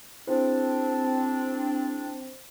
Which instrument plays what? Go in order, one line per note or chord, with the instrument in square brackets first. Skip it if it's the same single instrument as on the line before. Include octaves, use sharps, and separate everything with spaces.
[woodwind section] C4 D4 [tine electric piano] E4 G#4 [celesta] C5